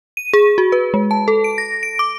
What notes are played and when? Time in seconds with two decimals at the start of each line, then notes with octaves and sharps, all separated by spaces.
0.17 D#7
0.33 G#4
0.58 F#4
0.72 B4
0.94 G#3
1.11 A5
1.28 A4
1.44 D7
1.58 A#6
1.83 D7
1.99 D6